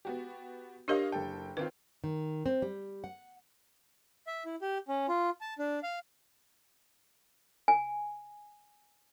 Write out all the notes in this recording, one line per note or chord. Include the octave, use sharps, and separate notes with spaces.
B3 F#4 G4
D4 G4 A#4 C#5 D#5 F5
F#1 A4 G5
D#3 C4 F4 B4
D#3
C4
G3
F#5
E5
E4
G4
C#4
F4
A5
D4
F5
G#5